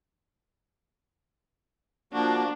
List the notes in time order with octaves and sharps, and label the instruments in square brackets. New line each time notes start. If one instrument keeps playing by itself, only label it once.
[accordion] F3 A#3 F#4 [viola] D4